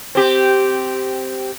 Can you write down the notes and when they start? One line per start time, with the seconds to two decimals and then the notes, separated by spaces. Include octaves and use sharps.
0.15 C4 G4